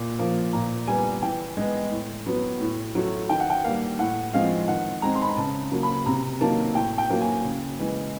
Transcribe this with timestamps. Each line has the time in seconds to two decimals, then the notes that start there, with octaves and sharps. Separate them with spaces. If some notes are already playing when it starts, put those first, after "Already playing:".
Already playing: A#2
0.19 F3 A#3
0.53 A#2 A#5
0.87 G3 B3 G#5
1.22 E3 G5
1.57 G#3 B3
1.91 A2
2.26 F#3 B3
2.60 A2
2.95 F#3 A3
3.29 D#3 G5
3.40 F#5
3.50 G5
3.64 G3 A#3 F5
3.99 A2 F#5
4.33 F3 G#3 C4 F5
4.68 D#3 F#5
5.02 G#3 C4 A#5
5.15 C6
5.22 B5
5.29 A#5
5.37 C#3 A5
5.71 F#3 A#3
5.83 B5
6.06 C3 A#5
6.41 D#3 F#3 A#3 A5
6.75 A2 G5
6.98 G5
7.10 F#3 A#3
7.21 G#5
7.44 C#3
7.79 E3 G#3